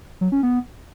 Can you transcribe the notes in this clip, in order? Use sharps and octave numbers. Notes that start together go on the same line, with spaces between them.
F#3
C#4
B3